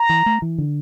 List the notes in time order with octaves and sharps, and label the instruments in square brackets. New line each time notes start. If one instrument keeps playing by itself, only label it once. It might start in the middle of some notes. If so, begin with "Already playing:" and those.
Already playing: [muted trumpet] A#5
[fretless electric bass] E3
A3
E3
D3